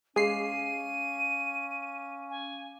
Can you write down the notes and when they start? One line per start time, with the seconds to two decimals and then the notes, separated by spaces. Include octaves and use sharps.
0.16 G#3 C#4 F5 D6 C7 D#7
2.30 G#5